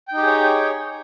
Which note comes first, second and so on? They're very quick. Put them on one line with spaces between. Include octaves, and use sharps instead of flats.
G5 D#4 G4 G#4 C#5